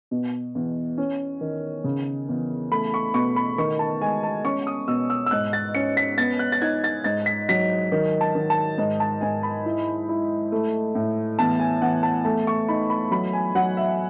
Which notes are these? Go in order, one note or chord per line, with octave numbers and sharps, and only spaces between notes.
B2
E2
C#4
D#3
C#3
E2
A3 B5
C#6
B2 C#6
B5
D#3 C#6
A5
G#3 G#5
A5
C#4 C#6
D#6
B2 E6
E6
E6
G#2 F#6
A6
C#4 C#7
B6
B3 A6
F#6
A6
D#4 G#6
A6
G#2 A6
B6
F#3 B6
D#3
A5
D#3
A5
G#2
A5
G#2 G#5
B5
E4
E4
A3
A2
E2 A5
G#5
E2 F#5
A5
A3 A5
C#6
D#4 B5
B5
F#3 B5
G#5
F#3 F#5
E5